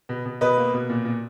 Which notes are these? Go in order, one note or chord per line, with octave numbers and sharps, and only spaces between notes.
B2
B2
B2 B4 D#5
A#3
B2
A#2
A#2